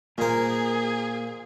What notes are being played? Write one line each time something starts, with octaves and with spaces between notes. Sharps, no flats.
A#2 A#3 G#4 A#4 C5